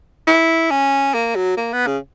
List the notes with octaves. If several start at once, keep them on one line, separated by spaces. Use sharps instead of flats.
E4
C#4
A#3
F#3
A#3
B3
C#3